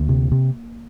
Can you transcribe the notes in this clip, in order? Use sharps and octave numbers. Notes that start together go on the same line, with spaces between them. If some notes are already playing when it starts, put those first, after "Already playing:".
Already playing: D2 A#3
C3
C3